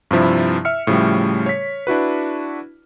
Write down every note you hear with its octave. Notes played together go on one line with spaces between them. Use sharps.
G2 C3 F3 E4
E5 F6 C#7
A2 C#3 F3 G3 A3
C#5 B6
D4 E4 F#4 B4